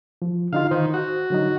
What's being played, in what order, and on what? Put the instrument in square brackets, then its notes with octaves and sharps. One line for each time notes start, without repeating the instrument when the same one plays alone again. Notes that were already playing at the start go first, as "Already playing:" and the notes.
[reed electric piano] F3
[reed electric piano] D3 D#4 F4 [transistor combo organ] F5
[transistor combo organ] D#3 [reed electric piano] C5
[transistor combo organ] F#4
[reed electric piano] D3 F#3 D#4